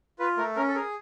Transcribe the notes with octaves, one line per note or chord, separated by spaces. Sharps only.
F4 B4
A3 A#4
C#4 A#4
A4
G#4 A#4